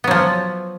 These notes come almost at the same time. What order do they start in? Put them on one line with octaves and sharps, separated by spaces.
B3 F#3 F3